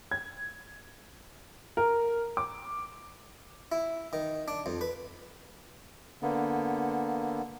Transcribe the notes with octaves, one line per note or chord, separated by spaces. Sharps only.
G#6
A#4
D6
E4
D#3
D4
F2
B4
D3 A#3 B3